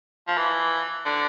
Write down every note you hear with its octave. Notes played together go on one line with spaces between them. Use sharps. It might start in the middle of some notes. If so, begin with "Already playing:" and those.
F3
E3
D3